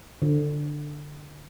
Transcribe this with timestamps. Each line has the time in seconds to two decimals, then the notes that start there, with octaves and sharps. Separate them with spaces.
0.22 D3